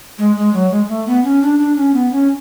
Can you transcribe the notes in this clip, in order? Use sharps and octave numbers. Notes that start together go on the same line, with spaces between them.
G#3
G#3
F#3
G#3
G#3
A3
B3
C#4
D4
D4
C#4
B3
C#4